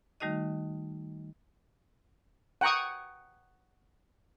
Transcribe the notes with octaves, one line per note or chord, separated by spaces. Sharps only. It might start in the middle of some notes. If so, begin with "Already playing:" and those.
D#3 G3 A3 D#4 F#4 D#5
F#5 G5 A#5 C#6 D#6